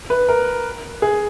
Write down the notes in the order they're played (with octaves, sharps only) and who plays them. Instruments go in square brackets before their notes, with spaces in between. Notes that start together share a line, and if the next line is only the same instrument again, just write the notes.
[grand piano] B4
A#4
G#4